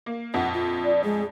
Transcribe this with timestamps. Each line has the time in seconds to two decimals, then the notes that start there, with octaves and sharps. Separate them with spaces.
0.06 A#3
0.34 A#1 F2 F#5
0.54 F4
0.84 D5
1.04 G#3 G#4